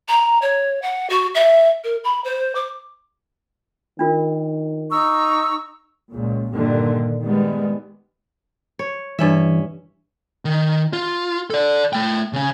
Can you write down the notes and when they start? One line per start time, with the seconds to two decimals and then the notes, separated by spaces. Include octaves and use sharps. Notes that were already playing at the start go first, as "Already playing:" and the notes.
0.08 A#5
0.42 C#5
0.82 F#5
1.10 F#4
1.35 E5
1.84 A#4
2.04 B5
2.24 C5
2.55 D6
3.99 D#3 D4 F4 A#4
4.91 D#4 A#5 C#6 E6
6.12 C#2 A#2
6.51 G2 A#2 D3 D#3
7.23 D#3 G3 G#3 B3
8.79 C#5
9.19 G2 E3 C#4 E5
10.45 D#3
10.93 F4
11.50 A4 D5
11.93 A3 G5
12.33 C#3 C#4